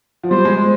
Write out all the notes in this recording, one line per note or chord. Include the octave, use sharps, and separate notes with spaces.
F3
G3 C5
G#3